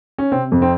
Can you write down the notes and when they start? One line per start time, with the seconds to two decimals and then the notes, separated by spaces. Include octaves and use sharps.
0.18 C#4
0.32 C3 C4
0.52 F2
0.62 C4